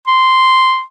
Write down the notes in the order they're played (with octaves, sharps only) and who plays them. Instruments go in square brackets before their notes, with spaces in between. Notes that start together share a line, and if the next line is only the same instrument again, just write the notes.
[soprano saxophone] C6